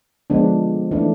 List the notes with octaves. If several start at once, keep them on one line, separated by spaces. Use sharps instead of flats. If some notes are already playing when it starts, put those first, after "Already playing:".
D3 F3 G#3 B3 D4
E3 A3 D4